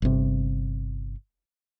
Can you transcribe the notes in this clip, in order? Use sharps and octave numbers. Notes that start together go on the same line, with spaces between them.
G1 C3